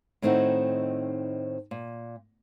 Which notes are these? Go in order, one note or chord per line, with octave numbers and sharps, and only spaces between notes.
A2 D#3 C4 D#4 E4 F#5
A#2